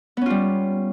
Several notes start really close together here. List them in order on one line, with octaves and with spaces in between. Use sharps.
B3 C#4 F4 G3